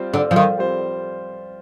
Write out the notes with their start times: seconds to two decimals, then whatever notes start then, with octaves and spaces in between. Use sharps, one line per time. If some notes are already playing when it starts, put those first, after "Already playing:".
Already playing: G3 C4 F4 C5
0.14 D3
0.31 F3
0.36 D#3
0.58 G3 C4 F4 C5